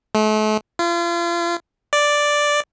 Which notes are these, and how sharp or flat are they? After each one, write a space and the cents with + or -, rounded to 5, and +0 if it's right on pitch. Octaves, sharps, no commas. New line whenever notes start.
A3 -40
F4 -35
D5 +0